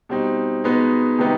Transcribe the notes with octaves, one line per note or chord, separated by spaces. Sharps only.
B2 G3 C4 D#4
B2 G#3 B3 D#4
C3 D#3 G3 B3 D#4